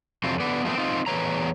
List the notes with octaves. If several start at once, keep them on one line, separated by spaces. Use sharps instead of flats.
F2 C3 E3 F#3 C4 F4
D3 B3 B4 D5
F3 G#3 A3 B3 C4
C4 D#4 F4
E2 E3 B4 C#5 A#5